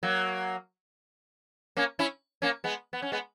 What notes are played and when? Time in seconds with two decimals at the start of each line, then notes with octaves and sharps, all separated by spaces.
0.03 F#3 A#3
1.77 A#3 C#4
1.99 C#4 E4
2.42 A#3 C#4
2.64 G#3 B3
2.93 B3
3.02 C#4
3.12 G#3 B3